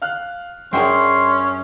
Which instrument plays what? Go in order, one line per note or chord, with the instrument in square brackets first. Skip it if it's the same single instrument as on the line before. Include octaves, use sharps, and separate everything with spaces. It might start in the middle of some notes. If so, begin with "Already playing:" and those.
[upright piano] F5 F6 F#6
[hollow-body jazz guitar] F#2 D4 A#4 [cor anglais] C#4 [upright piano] G#4 F#5 G5 [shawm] C6